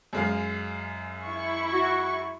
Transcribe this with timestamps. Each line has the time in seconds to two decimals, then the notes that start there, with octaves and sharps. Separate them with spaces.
0.13 F#2 G#3 F5
1.25 E4 C#6
1.72 F#4